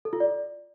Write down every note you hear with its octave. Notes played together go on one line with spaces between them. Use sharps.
A4
F4
D5